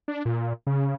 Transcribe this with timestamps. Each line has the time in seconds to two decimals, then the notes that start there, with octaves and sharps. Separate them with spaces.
0.08 D4
0.25 A#2
0.67 C#3